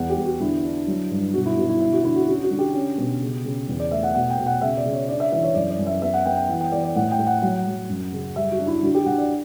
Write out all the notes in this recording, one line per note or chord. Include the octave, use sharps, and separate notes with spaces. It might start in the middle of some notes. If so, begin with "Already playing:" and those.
Already playing: E2 F#5
G4
E2
F#4
D3 E4
D4
F#3
G2
B2 F#4
E4
B2 F#4
E4
D3 E4
F#4
D3 E4
F#4
C#4 F#4
F#4
D3
G4
C#4
B2
C#3
C#3
E2
D5
A3 E5
F#5
B2 F#5
G5
B2
F#5
C#3 E5
D5
C#3
C#5
D4 D5
E5
E3 E5
C#5
F#2 D5
D5
F#2
E5
B3 E5
F#5
B3 G5
G5
E3 F#5
G5
E3 D5
D5
A2 F#5
G5
A2
F#5
F#3 F#5
F#3
F#2
C#3
G3 E5
F#4
D4
E4
D3 F#4
G4
D3 F#5
D5